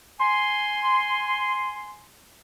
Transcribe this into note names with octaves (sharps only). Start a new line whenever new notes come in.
G#5 C6